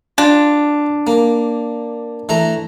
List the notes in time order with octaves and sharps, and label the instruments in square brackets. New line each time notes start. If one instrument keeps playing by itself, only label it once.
[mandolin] D4 [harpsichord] F4
[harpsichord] A#3
E3 A3 A#5